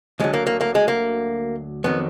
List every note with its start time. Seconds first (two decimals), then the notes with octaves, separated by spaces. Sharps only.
0.20 D2 D3 F#3 G#3
0.34 A#3
0.47 A#3
0.61 A#3
0.75 G#3
0.88 A#3
1.84 F2 D#3 F#3 B3